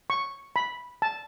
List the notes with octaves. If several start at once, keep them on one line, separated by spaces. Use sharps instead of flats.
C#6
B5
A5